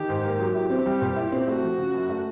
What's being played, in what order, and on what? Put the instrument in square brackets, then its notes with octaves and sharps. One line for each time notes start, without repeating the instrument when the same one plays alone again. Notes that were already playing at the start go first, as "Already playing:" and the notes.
Already playing: [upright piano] D#3 [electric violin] G4
[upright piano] G#2
A#3
F#3
[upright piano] E4 [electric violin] G4
[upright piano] C4
G3
A#2
E4
C4
[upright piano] A3 [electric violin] F#4
[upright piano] F3
C#3
F#2
A3